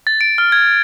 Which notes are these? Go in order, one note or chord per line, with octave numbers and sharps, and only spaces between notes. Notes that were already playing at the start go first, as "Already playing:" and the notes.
A6
D7
F6
G#6